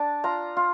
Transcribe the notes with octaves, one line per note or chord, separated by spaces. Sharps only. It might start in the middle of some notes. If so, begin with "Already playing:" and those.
Already playing: D4 A5
F4 A#5
F4